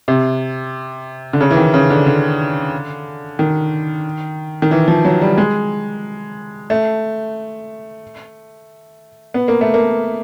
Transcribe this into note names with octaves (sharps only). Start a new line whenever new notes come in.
C3
D3
C#3
E3
D#3
C#3
D3
D3
D#3
D#3
E3
F3
F#3
G3
G#3
A3
B3
A#3
A3
A#3